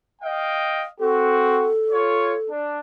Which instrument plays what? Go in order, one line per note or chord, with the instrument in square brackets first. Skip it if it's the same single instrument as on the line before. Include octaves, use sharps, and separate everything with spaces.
[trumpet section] D#5 F5 G5
[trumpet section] C4 F#4 [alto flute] A4
[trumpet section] F4 C#5
D4